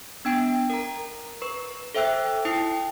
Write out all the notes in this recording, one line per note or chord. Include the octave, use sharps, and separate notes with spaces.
B3 D4 G5 D7
A#4 A#5
B4 C#6
A4 C5 E5 G5 E6 F#6
E4 G5 D#6 C7